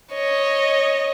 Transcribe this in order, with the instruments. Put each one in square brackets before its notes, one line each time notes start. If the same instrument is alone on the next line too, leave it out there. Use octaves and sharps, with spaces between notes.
[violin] C#5 D#5